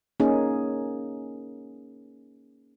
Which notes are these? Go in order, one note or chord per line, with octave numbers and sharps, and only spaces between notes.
A#3 C#4 D#4 G#4